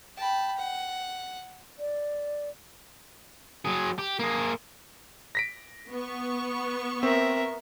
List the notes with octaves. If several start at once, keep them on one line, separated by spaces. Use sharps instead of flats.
G5 A5 B5
F#5
D5
F#3 G#4
G4
A#3 G#4
A#6 B6 D7
B3 C#6
C4 A#4 E5